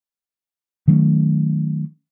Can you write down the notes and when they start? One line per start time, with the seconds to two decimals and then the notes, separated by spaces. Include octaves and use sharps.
0.88 D#3 F#3 A3 C#4